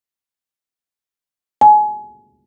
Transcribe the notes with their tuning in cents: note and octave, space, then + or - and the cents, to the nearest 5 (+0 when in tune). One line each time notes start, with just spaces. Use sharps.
G#5 +25